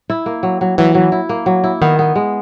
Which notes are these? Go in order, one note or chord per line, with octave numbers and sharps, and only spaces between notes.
E4
A#3
F#3
F#3
E3 F#3
F#3
E4
A#3
F#3
E4
D#3 B3
B3
G#3